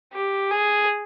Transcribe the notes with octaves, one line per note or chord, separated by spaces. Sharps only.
G4
G#4